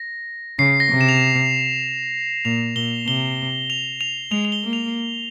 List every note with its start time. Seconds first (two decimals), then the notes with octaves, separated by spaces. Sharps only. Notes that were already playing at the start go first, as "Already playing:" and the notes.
Already playing: A#6
0.59 C#3 C7
0.80 A#6
0.90 C3
1.01 E7
1.09 F7
1.17 E7
2.45 A#2 F7
2.76 A#2 G7
3.07 C3 G7
3.70 F7
4.01 F7
4.31 G#3 F7
4.45 F7
4.52 G7
4.63 A#3
4.73 F7